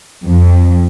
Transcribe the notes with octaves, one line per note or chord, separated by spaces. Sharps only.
F2